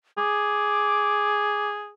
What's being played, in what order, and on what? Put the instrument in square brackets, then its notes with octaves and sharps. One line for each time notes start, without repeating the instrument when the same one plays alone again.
[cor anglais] G#4 [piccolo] D6